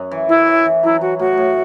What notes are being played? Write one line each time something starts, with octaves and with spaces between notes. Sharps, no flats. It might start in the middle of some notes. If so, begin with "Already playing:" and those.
Already playing: F#2 C#4
E3
F#2 E4
E3
E3
F#3 E4
F#3 F#4
A2 F#4
A2